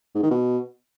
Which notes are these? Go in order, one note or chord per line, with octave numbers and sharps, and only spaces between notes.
G#2
D#3
B2